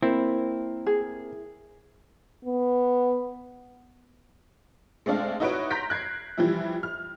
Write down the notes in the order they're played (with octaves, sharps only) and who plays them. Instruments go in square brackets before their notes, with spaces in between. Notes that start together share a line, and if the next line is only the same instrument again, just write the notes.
[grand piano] A#3 A#4 [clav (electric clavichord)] C4 [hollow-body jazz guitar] E4
[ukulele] G#4
[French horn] B3
[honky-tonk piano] G#3 A3 C4 D4 F5
D#4 E4 F#4 B4 C#5 D7
A#5 C6 G6 A#6 B6 D7
F#6 G#6 C7 D7
E3 F3 G3 E4
F6